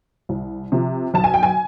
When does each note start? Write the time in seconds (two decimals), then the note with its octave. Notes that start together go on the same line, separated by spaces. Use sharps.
0.29 C2
0.72 C3 F3
1.14 B1 A5
1.24 G#5
1.34 G5
1.43 G#5